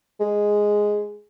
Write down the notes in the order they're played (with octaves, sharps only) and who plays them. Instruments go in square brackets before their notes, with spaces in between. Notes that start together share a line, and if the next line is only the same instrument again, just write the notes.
[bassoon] G#3